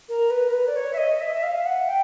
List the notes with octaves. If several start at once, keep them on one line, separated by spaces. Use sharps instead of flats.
A#4
B4
A#4
B4
D5
C#5
E5
D#5
E5
E5
F5
F#5
G5